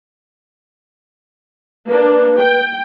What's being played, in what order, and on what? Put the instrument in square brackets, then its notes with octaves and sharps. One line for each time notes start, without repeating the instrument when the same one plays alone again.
[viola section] A#3 D4 [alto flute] B4
[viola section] G5